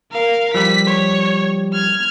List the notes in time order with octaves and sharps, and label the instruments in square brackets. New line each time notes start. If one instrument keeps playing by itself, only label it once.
[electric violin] A#4 F5
[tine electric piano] F3 G3 G4 [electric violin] B6
[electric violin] C#5
F6 G#6